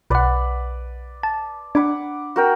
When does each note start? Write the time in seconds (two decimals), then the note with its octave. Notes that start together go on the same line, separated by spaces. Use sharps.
0.10 B1 B4 D5 F#5
1.23 A5
1.75 D4 F#5 B5 D6
2.36 F#4 A#4 G5